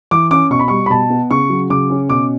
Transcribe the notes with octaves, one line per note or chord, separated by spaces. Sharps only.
E3 D6
C#4 D6
B2 C#6
B5
G3 C#6
B5
B2 A5
B3
C#3 C#6
F#3
C#3 D6
C#4
B2 D6